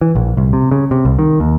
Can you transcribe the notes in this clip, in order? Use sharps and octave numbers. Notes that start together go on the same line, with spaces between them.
E3
A#1
C2
C3
C#3
C3
C2
D#3
D#2